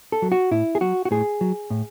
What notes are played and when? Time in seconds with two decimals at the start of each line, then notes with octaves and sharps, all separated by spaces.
0.12 A4
0.22 F#3
0.32 F#4
0.51 A2 E4
0.75 G#4
0.81 F#3 F#4
1.05 F#4
1.11 A2 G#4
1.41 F#3
1.70 A2